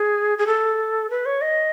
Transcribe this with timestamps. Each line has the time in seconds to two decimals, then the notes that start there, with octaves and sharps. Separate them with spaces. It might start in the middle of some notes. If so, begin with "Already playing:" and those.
Already playing: G#4
0.38 G#4
0.47 A4
1.10 B4
1.26 C#5
1.41 D#5